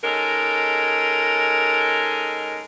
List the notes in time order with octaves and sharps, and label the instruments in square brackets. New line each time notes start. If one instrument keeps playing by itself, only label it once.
[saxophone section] G#3 C#4 D#4 A4 A#4